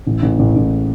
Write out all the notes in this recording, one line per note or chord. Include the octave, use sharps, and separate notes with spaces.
A1
A1
A1
A1